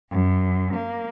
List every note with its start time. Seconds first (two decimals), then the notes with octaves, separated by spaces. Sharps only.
0.11 F#2
0.74 A#3